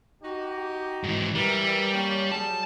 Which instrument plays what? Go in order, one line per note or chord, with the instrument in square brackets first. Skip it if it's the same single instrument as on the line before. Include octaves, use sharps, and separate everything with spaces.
[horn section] D#4 F#4 G4
[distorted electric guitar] G#2 E3
[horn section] E3 A#4 [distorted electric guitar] G3
[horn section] A#3 C#4 G5
[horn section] F#3 G3 G#4 [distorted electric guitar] A5